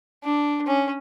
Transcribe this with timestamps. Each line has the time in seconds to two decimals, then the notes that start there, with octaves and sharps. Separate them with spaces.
0.24 D4
0.66 C#4